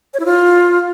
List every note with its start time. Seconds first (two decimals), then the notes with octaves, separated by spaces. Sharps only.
0.14 C#5
0.19 E4
0.25 F4